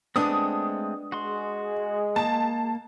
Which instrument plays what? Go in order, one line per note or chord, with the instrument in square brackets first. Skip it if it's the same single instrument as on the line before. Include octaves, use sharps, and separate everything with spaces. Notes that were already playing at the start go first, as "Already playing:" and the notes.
[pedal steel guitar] G#3 A3 C4 [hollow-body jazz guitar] B3 D4 [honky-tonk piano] D#6
[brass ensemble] G#3 [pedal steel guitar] F#4 C6
[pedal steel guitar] A#3 [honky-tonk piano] A5